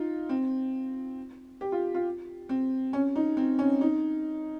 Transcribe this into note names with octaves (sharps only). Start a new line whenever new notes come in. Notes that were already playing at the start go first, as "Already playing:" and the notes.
Already playing: D#4 F4
C4
G4
F4
F4
C4
C#4
D#4
C4
C#4
D#4